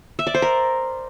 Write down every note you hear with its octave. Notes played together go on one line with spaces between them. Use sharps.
E5
D5
C5
A#4